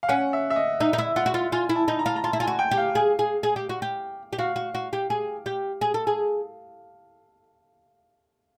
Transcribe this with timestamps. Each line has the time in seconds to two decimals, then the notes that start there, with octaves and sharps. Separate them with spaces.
0.03 F5
0.09 C#4 F#5
0.33 E5
0.50 E5
0.56 D#5
0.80 D#4 E5
0.93 D#4
0.98 E4 E5
1.16 F4 F#5
1.26 F#4
1.34 F4
1.52 F4 G#5
1.69 E4
1.76 A5
1.88 D#4
1.99 A#5
2.06 F4 A5
2.16 A#5
2.24 F4 A5
2.33 E4
2.40 F4 G#5
2.47 F#4
2.59 G5
2.71 G4
2.77 F5
2.95 G#4
3.19 G#4
3.43 G#4
3.56 G4
3.69 F#4
3.82 G4
4.33 G4
4.38 F#4 F5
4.56 F#4
4.74 F#4
4.93 G4
5.10 G#4
5.46 G4
5.81 G#4
5.94 A4
6.07 G#4